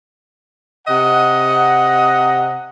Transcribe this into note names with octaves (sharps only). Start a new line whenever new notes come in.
C3 D#5 F#5